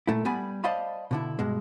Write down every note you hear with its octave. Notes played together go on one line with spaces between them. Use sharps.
A#2 A3 E4
G3 B3 G#5 B5
C5 D5 D#5 F5 A5 B5
B2 D3 E4
G2 B2 G#3